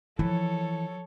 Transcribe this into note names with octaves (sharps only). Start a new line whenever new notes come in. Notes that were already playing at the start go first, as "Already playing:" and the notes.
E3 F3 A4 C#5